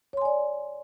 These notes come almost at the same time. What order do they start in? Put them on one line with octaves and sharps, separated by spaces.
C#5 C6 G#5 D5